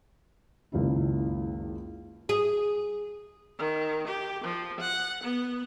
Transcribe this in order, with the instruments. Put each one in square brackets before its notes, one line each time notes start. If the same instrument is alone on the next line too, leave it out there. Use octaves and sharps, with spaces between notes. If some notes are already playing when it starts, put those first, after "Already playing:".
[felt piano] F#1 C#2 D#3 E4
[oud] G#4
[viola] D#3
G4
F3
F#5
B3